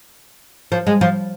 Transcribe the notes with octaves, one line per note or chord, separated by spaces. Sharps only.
F3
G#3
F3